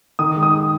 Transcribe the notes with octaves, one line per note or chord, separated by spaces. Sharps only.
D#3 D#6
G#3
D#6